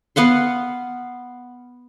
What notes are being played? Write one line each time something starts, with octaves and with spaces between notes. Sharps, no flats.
B3 F5 F#5 C6